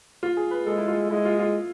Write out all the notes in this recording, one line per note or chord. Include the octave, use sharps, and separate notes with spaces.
F4
G#4
B4
G#3 A4
E4
F4
G#3 E4
F4
F4